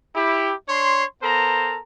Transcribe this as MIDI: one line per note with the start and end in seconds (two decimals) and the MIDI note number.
0.16 0.52 64
0.16 0.52 67
0.68 1.04 62
0.68 1.04 73
0.68 1.04 84
1.22 1.79 59
1.22 1.79 69
1.22 1.79 70
1.22 1.79 72
1.22 1.79 82